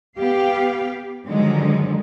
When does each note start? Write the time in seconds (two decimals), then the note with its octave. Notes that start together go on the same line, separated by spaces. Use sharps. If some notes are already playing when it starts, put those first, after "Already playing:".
0.18 B3 G4 F5
1.26 G2 D3 D#3 F3 F#3 G#3